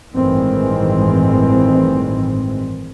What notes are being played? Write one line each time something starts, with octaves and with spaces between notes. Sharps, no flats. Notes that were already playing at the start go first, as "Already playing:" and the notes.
A1 G2 D#3 E3 G#3 C4